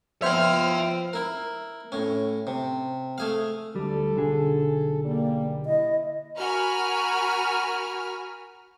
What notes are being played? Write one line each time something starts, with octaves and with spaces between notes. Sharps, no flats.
F3 B3 C5 C#5 E5 G5 F6
E4 A#4
A2 C#4
C3
A3 G#4 F5
D2 G3 A4
B1 D3 G#4
G3 A#3
E4 D#5
F#4 A#4 G#5 B5 F6